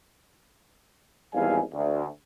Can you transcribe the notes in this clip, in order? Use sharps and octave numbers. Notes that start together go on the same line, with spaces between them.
G#1 E2 G3 F5 G#5
D2